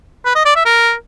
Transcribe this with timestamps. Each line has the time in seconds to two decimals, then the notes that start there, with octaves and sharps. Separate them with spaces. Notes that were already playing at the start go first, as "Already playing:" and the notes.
0.25 B4
0.35 D#5
0.45 D5
0.55 E5
0.65 A#4